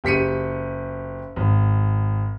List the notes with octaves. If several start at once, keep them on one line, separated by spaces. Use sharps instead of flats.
F#1 G4 B6 C#7 D#7
G#1